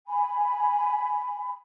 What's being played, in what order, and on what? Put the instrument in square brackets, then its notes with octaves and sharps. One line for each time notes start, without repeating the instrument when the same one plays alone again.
[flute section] G#5 B5